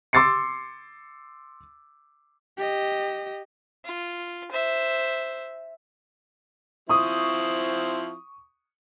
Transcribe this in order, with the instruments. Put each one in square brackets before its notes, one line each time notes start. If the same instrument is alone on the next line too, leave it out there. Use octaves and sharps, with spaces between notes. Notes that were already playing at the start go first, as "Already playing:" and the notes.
[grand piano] C6 D6 E6 A6 C7 C#7
[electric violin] G4 D#5
[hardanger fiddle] F4
C5 E5
[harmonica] F3 C4 E4 [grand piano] C#6 D#6